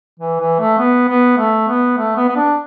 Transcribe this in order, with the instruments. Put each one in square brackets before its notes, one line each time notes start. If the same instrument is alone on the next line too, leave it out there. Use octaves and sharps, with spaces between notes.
[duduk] E3
E3
A3
B3
B3
A3
B3
A3
B3
B3
D4